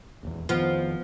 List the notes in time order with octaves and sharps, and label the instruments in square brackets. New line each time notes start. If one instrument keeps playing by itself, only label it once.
[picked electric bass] D#1 E2
[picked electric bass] F2 D#3 [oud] F3 B3